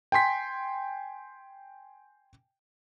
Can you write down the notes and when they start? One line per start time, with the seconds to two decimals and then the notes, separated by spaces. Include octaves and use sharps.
0.12 G5 G#5 C6 B6